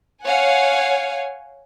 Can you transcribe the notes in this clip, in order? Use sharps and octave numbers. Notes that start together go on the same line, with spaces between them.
C#5 F5 F#5 G#5